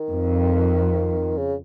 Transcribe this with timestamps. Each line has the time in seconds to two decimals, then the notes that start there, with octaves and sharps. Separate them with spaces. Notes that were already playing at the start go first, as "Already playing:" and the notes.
Already playing: D#3
0.08 F2
1.38 C#3